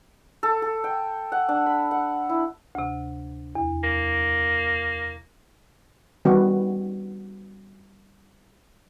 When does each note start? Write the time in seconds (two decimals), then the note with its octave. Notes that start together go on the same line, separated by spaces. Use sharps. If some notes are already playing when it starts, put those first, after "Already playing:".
0.43 A4
0.62 A4
0.84 G5
1.32 F#5
1.49 D4
1.66 B5
1.91 F#5
2.29 E4
2.75 D2 C3
3.55 E2
3.83 A#3
6.25 D#3 G3 B3 C#4 F#4